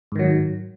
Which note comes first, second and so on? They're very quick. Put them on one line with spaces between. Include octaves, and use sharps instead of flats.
G#2 D#3 F#3